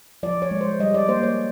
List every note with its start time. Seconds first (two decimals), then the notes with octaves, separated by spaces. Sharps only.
0.23 F3 D5
0.42 C#5
0.51 G#3
0.61 C5
0.80 G3 D#5
0.94 D5
1.08 A#3 C5
1.23 C#5